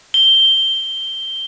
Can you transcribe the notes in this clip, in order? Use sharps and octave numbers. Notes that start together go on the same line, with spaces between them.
G7